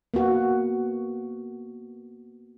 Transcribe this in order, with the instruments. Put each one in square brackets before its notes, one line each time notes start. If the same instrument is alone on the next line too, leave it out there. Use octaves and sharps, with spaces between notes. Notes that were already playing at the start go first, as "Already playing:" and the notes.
[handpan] A#3 B3 F#4